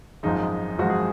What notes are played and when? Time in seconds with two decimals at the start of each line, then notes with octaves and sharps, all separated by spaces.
0.23 G#1 F#2 F3 G#3 D#4
0.79 G#1 F#2 F3 G#3 F#4
0.90 G#4